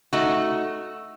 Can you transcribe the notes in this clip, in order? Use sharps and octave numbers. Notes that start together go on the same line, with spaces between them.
A3 D#4 F#4